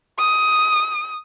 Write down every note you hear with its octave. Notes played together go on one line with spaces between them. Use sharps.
D#6